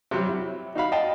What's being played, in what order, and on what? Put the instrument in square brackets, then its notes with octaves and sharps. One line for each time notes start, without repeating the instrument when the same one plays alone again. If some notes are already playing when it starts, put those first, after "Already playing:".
[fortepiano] C3 F#3 G3
E4
D#4 F#4 F5 B5
D#5 F5 G5 A5